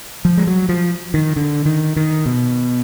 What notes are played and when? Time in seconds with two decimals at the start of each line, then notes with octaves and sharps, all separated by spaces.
0.25 F3
0.37 G#3
0.47 F#3
0.69 F3
1.14 D#3
1.36 D3
1.65 D#3
1.96 D#3
2.26 B2